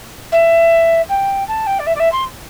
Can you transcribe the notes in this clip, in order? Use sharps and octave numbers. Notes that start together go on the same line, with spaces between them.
E5
G5
A5
G5
D5
E5
D5
E5
C6